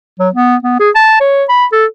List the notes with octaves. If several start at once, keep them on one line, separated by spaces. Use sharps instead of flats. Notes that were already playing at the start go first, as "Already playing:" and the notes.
F#3
B3
B3
G#4
A5
C#5
B5
A4